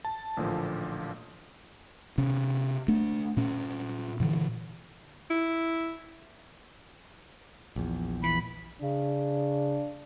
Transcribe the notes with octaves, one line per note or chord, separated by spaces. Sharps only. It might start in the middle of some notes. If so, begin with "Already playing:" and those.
A5
A1 A#2 D3 F3
C3 C#4
A3 D4
A#2 C#4
A#2 D3 E3
E4
A#1 E2
E3 B5
C#3 D4